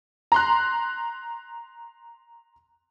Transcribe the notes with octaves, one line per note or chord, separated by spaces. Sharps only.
A#5 C6 F#6